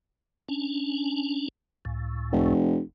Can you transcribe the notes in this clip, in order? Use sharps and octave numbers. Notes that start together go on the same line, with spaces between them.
C#4 D4
C#2 A2
F1